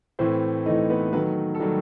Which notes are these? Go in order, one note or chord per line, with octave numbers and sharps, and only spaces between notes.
A2 E3 A3 C4 C5
A2 E3 A3 D#4 D#5
B3 B4
D#3 F#3 A3 B3 B4
A4
D#3 F#3 G3 A3 G4